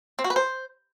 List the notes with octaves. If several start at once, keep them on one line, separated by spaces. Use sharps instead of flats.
C4
F#4
B4
C5